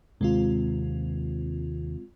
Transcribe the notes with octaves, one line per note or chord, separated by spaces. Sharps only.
D#2 C3 G#3 C4 F4